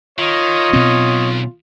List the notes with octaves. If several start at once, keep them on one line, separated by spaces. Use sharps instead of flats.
D#3 F4 C#5 D#5
B1 B2 C4